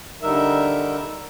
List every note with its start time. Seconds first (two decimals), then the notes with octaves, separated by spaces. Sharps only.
0.22 D3 G3 D#4 A#4 E5